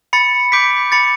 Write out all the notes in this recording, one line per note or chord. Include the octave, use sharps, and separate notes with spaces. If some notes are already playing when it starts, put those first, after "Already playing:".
B5 A6 C#7
D6 G6 B6 D7
B5 A6 C#7